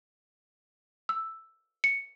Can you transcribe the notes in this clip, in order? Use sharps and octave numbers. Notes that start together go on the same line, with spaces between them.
E6
C#7